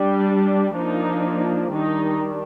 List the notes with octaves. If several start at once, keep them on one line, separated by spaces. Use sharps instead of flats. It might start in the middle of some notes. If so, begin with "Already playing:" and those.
Already playing: G3 D4
F3 A#3 D4 D#4
D#3 G3 D4 D#4